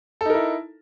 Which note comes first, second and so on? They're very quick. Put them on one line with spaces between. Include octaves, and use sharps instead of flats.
A4 D#4 A#4 E4